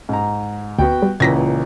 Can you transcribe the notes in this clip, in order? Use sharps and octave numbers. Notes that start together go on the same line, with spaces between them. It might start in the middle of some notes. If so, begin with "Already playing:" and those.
G#2 A#5
D2 B3 F#4 G5
G3
C#2 A#2 E3 G#6 A#6 B6